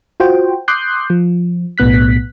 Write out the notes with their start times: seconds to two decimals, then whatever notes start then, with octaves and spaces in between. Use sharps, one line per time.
0.20 F4 F#4 C5 G5
0.68 C6 D6 D#6 F#6 G6 C7
1.10 F3
1.78 B1 A2 B3 F#6 B6